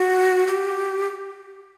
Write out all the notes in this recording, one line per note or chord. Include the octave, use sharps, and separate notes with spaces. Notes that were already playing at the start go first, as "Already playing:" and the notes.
Already playing: F#4
G4